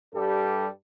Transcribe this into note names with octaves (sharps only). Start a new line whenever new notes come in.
G2 G3 G4 A4